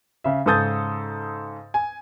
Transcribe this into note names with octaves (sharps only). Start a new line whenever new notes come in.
C#3 E5
G#2 C#3 A4 D#6 G6 A6
G#5